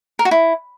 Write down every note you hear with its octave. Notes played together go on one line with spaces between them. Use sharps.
A#4
F#4
E4